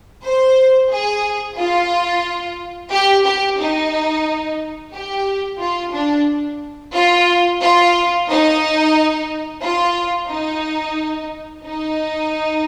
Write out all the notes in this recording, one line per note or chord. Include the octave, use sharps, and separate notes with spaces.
C5
G#4
F4
G4
G4
D#4
G4
F4
D4
F4
F4
D#4
F4
D#4
D#4